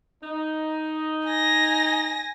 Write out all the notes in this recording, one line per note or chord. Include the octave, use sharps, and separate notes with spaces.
D#4
G#5 A#6